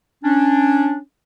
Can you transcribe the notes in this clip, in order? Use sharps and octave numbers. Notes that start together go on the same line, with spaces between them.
C#4 D4